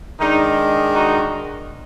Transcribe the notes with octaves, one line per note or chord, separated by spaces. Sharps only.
D#3 G#3 D4 D#4
D#4 F#4